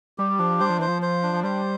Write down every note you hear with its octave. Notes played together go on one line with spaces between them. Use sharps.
G3 G4
F3 D4
G3 C5
F3
E3 C5
F3
C5
D4
F3
G3 C5